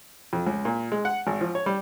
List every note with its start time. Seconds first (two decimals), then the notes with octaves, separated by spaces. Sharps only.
0.33 F2
0.47 C#2
0.65 A#2
0.92 G#3
1.05 F#5
1.27 G#1
1.41 F3
1.55 C#5
1.66 G3